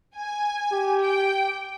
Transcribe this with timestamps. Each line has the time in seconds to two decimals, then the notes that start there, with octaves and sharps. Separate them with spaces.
0.17 G#5
0.72 G4
1.00 G5